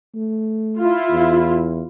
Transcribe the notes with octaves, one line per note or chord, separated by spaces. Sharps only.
A3
E4 F4
E2